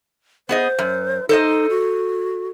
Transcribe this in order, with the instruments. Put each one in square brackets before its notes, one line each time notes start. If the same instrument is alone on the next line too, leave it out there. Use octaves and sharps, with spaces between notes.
[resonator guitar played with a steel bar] B3 G#4 D#5 [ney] C5
[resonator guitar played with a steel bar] F#2
[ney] D#4 [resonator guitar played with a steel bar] A4 C5 D#5
[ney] F#4